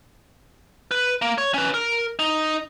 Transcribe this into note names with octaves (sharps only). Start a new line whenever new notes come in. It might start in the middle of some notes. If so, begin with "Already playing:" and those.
B4
A#3
C#5
C#4 B4
A#4
D#4